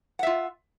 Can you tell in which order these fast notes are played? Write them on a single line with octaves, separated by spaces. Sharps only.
F#5 E5 F4